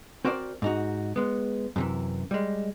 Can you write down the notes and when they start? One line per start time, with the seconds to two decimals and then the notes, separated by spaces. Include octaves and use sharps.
0.25 C4 F#4 A#4 C5 D5
0.62 G#2 D#4 F#4
1.16 G#3 B3
1.76 F#2 C3 E3
2.31 G3 G#3